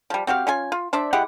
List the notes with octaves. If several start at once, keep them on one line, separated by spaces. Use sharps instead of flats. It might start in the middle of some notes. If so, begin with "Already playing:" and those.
F3 G3
C4 F#4 G4 F5
C#4 F4 G#5
F4
D4 C5 D5 E5
G#3 E4 G4 F#5